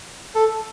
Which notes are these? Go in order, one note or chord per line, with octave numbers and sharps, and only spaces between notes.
A4